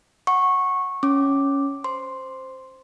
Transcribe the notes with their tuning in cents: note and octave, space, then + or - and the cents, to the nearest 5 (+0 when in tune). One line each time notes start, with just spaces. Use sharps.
F#5 +0 C#6 -15
C#4 +0 D6 +0
C5 +0 C6 +0